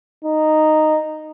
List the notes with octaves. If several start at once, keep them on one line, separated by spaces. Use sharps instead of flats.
D#4